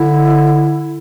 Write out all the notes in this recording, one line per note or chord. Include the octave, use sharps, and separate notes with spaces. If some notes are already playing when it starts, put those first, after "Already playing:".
Already playing: D3 E4